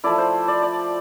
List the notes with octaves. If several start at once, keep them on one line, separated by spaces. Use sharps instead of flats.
F3 A3 E4 D5
C5
D5
D5